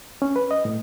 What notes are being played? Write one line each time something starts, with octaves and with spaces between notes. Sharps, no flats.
C#4
B4
D#5
A2